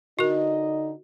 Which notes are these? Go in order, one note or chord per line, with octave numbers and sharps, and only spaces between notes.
D3 D#4 F#4 A#4 D#5